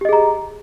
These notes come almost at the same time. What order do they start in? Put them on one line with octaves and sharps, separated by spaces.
G4 D#5 G#4 A#5